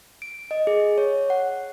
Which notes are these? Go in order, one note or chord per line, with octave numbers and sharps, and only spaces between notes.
D7
D#5
G#4
C#5
F#5